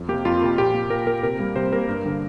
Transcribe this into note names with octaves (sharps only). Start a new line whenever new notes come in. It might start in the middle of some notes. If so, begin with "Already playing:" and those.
Already playing: F2
C3 A#3 G4
F2 F4
C3 A#3
A#2 G4
A#3
A#2 A#4
A#3 A#4
C3 A#4
G3 A#3
C3 C5
G3 A#3 A#4
G2
D3 A#3